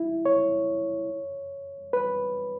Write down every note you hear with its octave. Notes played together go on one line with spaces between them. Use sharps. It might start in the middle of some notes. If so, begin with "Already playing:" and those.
Already playing: E4
C#5
B4